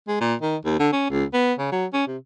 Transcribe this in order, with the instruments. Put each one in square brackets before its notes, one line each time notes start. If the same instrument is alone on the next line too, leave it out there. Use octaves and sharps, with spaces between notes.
[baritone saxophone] G#3
A#2
D#3
D#2
D3
C#4
C#2
B3
C#3
F#3
C#4
C3